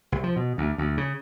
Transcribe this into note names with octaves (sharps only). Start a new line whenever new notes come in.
C2
F3
B2
D2
D2
C#3